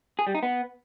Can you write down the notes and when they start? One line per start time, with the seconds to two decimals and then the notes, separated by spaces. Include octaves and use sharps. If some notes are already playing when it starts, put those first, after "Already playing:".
0.19 G#4
0.27 G3
0.35 D#4
0.43 B3